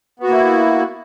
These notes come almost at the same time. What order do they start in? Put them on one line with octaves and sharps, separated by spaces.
B3 F#4 A#3 E4